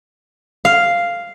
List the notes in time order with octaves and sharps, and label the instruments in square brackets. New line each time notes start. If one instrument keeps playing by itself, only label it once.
[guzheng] F5